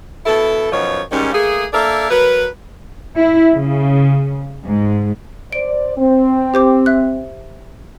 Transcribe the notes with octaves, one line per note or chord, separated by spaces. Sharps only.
B2 E4 A4
F#2 B2 D#3 F3 C#5
G#2 D#3 G3 C#4
A3 A#3 G#4
A#3 D4 A4 A#4 E5
F#3 A#4 B4
E4
C#3
G#2
C5 D5 D7
C4
G4 C5 D6
E5 F#6